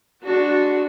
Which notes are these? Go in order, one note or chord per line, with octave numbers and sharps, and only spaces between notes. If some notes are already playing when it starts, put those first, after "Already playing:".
G#3 D4 F#4